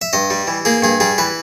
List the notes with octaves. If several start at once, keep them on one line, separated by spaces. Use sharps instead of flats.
E5
G2 D#5
G3
E3
A#3 G#4
G2 G#4
G3 G#4
E3 B4